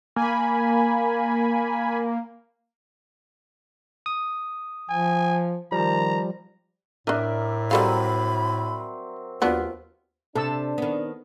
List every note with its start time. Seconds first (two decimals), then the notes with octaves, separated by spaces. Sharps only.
0.16 A#3 G#5 B5
4.06 D#6
4.90 F3 G#5
5.72 D#3 F3 G3 A#5
7.07 A2 D4 D#4 A#4 D5 E5
7.71 F#3 G3 C4 A4 F5 B5
9.42 D#2 F#3 B3 D4 F4
10.35 C3 D4 A4 A5 E6
10.78 D#3 B3